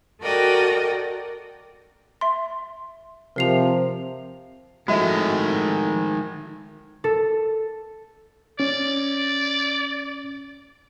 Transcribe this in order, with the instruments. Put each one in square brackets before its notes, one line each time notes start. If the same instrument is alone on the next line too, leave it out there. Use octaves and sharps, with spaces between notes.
[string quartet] F#4 A4 A#4 D5 D#5 G5
[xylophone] E5 C6
[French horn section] C3 F3 [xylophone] A#4 C7 F7
[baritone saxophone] A2 [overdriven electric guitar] D#3 G#3 [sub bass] F3 [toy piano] F#4 E5
[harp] A4
[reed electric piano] C#4 [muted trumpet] D5